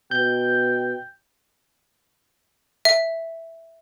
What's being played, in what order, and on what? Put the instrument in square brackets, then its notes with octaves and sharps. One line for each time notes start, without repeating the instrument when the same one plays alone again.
[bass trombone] B2 [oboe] G5 [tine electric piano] G6
[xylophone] E5